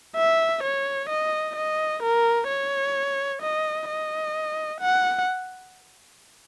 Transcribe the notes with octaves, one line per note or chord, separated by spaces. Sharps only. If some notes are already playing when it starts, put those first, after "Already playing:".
E5
C#5
D#5
D#5
A#4
C#5
D#5
D#5
F#5